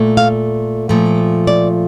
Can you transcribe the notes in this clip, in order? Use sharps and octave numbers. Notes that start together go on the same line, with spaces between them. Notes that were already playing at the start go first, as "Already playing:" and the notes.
Already playing: A#2 A3
F5
A#2 F3 A3
D5